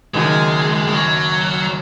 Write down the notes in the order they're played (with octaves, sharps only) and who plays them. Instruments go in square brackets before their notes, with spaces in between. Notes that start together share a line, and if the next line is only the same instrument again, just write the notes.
[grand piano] F#1 F#2 D#3 [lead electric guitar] G#3
[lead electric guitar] G#3
F#3